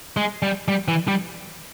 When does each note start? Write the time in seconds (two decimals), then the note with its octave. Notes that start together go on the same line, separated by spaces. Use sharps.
0.17 G#3
0.42 G3
0.68 G3
0.88 E3
1.08 G3